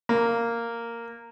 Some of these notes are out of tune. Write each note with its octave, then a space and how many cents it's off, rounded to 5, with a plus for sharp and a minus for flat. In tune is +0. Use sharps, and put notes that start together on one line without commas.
A#3 -5